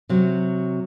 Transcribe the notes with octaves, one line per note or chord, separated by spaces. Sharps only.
C3 F#3